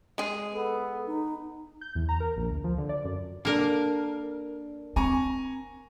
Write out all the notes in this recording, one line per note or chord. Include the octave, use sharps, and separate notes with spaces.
G#3 G#4
B3 A4
D#4
G6
E2
A#5
A#4
A#1
D2
F3
D3
D5
F#2
A#3 D4 A4 A#4
C4 G#5 A#5 C#6